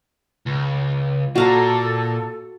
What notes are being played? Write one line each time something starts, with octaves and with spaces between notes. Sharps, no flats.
C#2
A#2 F#4 A4 F5 A#5